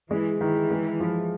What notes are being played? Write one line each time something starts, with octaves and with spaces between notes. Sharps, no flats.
E3 G#3
D#3 E3
G#3
F3